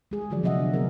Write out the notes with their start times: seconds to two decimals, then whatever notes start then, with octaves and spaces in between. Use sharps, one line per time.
0.11 G#3 G#4
0.30 D3 F3 F#3 F#4 G#4 D5
0.43 C3 F#3 A#3 D#5 E5 F#5
0.55 B3 D4
0.73 G#3 B3 D4 G#4 A#4